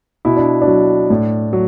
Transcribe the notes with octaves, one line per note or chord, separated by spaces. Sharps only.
B2 E4
D4
D4
F#3
A2
F#3